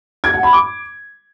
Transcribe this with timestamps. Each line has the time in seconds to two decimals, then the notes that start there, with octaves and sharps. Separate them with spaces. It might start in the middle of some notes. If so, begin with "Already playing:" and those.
0.24 G#6
0.33 F#5
0.43 B5
0.53 D6